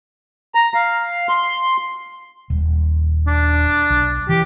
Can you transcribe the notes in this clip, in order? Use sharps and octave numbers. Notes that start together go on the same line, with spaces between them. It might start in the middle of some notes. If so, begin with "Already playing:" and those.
A#5
F5
C6
D#1
D4
B1
E3 G4